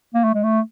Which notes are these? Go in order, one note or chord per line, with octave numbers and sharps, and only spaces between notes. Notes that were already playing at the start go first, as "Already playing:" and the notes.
A#3
A3
G#3
A3